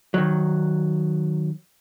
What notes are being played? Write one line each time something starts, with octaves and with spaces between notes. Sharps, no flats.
D#3 F#3